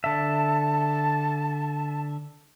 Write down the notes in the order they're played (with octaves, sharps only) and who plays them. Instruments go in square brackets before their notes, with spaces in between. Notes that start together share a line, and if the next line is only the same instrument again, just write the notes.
[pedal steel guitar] D3 E5 [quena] A5